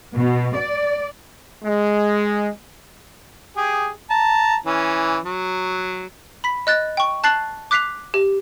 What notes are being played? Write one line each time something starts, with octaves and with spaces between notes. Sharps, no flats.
B2
D5
G#3
G4 G#4
A5 A#5
E3 C#4
F#3
B5 B6
D#5 F#6 A6
G5 C#6
A5 F#6 A6 C7 F#7
D6 F#6 B6 C7 F7
G4